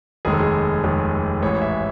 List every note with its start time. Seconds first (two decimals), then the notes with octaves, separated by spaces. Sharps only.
0.25 F1 D#2 D#3 G#3 G#4
0.33 A4
0.40 G#4
0.83 F1 D#2 D#3 G#3
1.42 A1 G#2 E3 C#5
1.62 E5